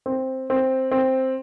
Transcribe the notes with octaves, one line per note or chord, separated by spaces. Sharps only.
C4
C4
C4